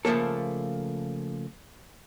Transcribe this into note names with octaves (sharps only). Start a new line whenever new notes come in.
C#3 F3 A3 A#3 A4